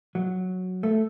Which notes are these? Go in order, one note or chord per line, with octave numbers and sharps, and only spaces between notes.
F#3
A3